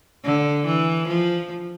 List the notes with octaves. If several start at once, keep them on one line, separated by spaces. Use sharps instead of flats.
D3
E3
F3